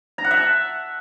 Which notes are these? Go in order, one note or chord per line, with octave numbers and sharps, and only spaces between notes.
A#5
F#5
E5
A5